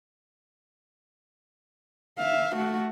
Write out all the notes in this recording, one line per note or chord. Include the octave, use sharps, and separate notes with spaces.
E5 F5
A3 F#4